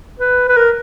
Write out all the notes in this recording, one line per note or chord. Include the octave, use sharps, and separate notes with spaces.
B4
B4
A#4